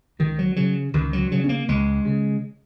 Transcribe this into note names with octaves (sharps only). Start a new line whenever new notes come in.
C#2 D#3
F#3
C#3 F#3
C#2 D#3
F#3
C#3 F#3
C#4
A#3
C#2 G#3
C#3